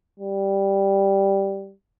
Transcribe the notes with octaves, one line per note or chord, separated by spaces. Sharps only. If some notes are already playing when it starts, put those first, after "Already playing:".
G3